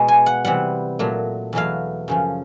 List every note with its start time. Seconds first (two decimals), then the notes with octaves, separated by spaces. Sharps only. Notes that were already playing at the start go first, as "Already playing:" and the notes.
Already playing: B2 G#3
0.08 G#5
0.26 F#5
0.45 C3 E3 G3 F#5
0.99 A#2 F#3 A3
1.53 E2 B2 F#3 A3 F5
2.08 F#2 C#3 F3